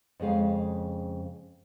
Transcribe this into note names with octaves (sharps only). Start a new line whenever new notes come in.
F2 C#3 G#3 F5